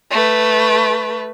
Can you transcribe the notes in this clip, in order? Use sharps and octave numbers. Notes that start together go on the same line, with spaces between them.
A3 B4